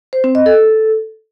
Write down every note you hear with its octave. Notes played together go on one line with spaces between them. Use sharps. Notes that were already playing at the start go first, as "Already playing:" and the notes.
C5
C4
D#5
A4